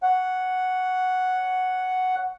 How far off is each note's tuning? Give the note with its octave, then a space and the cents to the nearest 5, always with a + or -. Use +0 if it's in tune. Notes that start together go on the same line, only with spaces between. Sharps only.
C#5 +15 F#5 +0